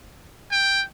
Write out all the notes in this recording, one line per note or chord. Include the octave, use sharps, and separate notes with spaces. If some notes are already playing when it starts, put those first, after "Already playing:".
G5